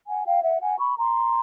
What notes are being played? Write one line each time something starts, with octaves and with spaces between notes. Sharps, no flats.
F#5 G#5
F5 G5
E5 F#5
F#5 G#5
B5 C#6
A#5 C6